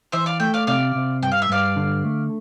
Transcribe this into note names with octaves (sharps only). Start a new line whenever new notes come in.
E3 C5 E5
D5 F5
A3 E5 G5
D5 F5
C3 D5 F5
C3
G2 G5
F5
E5
G2 D5 F5
D3
A3